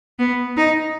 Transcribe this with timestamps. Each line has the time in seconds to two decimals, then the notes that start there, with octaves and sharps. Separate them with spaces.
0.19 B3
0.57 D#4